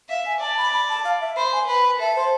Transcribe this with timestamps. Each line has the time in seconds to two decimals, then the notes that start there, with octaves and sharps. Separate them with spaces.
0.09 E5 F5
0.25 G#5
0.41 D5 A5
0.57 B5
0.73 B5
0.89 A5
1.04 F5
1.21 E5
1.36 C5 B5
1.52 G#5
1.67 B4 B5
2.00 A4 E5
2.15 C5